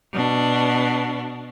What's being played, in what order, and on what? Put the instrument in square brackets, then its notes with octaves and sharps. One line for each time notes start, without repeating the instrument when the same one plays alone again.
[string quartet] B2 D4